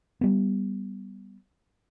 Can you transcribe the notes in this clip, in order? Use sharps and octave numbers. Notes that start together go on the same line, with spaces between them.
G3 B3